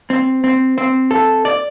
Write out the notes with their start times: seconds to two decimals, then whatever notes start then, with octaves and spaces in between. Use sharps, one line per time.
0.10 C4
0.44 C4
0.78 C4
1.11 A4
1.45 D5